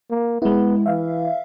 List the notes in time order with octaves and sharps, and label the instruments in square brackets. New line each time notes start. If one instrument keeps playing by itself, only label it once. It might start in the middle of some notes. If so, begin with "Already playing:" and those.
[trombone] A#3
[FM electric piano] G#3 E4 [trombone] B3
[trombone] E3 [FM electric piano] E5 F5